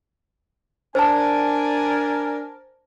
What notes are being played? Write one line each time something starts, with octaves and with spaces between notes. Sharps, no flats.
D4 A#4 C5 G#5 A5